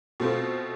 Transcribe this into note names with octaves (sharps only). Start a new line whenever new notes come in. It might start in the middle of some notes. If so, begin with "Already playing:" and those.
B2 A3 C4 F4